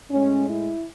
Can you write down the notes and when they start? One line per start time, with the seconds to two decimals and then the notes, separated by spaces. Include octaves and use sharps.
0.10 A2 G#3 C#4
0.49 E4